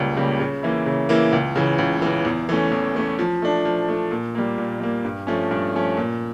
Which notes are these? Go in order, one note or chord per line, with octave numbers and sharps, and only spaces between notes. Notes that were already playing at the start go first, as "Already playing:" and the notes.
Already playing: C#2 C#3 G3 A#3
C#3 G3 A#3
C#3
E3 A#3 E4
C#3
E3 A#3 E4
C#2
C#3 E3
C#2
C#3 E3
E2
E3 A3 C#4
E2
E3 A3 C#4
F3
A3 D4
F3
A3 D4
A#2
G3 A#3
A#2
G3 A#3
G2
F3 A3 C#4
G2
F3 A3 C#4
A#2